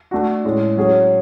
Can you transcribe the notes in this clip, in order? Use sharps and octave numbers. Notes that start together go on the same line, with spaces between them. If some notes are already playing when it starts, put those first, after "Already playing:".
A3 D4 F#4
A2 G#3 C#4
F#3 C#4 G#4 C#5